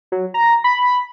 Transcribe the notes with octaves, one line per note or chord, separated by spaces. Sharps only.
F#3
A#5
B5